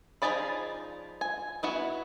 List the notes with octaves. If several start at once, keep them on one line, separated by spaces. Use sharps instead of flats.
F3 D#4 G#4 D5 B5
G#5
B3 E4 F#4